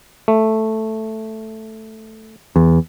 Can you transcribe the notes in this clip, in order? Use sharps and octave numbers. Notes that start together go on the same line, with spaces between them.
A3
E2